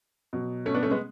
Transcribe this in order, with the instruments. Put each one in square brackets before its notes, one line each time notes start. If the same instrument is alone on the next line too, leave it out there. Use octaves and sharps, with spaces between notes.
[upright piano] B2 F#3
A3 C#4
B3 D4
A3 C#4
G#3 B3